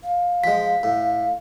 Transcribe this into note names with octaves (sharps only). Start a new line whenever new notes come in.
F5
F3 G#3 B6
A2